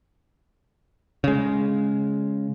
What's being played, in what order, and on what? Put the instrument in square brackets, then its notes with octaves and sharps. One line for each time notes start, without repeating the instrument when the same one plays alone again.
[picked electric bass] C#3 G#3